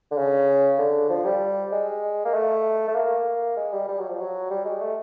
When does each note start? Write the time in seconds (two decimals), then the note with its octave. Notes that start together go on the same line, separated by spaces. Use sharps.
0.11 D3
0.17 C#3
0.78 D3
1.10 F3
1.25 G3
1.72 G#3
2.25 A#3
2.34 A3
2.88 A3
2.96 A#3
3.56 G#3
3.73 G3
3.88 G3
3.99 F#3
4.09 F3
4.20 F#3
4.50 G3
4.65 G#3
4.80 A3